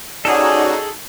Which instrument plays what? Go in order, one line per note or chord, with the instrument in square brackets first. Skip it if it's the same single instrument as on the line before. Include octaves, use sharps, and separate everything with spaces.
[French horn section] D#2 C#4 D5 [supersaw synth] D#4 F#4 [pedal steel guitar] G#4 A4